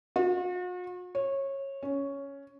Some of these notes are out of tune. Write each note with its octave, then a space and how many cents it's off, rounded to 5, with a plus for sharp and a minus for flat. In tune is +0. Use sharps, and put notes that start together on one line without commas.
F#4 -45
C#5 -20
C#4 +5